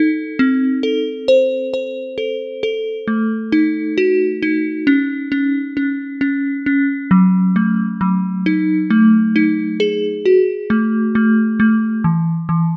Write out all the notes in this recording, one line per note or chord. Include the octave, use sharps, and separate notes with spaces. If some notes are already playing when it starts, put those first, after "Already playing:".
Already playing: D#4 A4
C4
A4
C5
C5
A4
A4
A3
D#4
F#4
D#4
C#4
C#4
C#4
C#4
C#4
F#3
A3
F#3
D#4
A3
D#4
G#4
F#4
A3
A3
A3
E3
E3